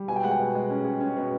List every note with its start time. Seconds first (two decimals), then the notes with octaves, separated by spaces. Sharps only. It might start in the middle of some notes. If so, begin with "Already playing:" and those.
Already playing: G3
0.08 B2 G#5
0.16 G5
0.23 G#3 F#5
0.31 G5
0.39 B2
0.55 G#3
0.70 C#4
0.85 G#3
1.00 C#4
1.17 B2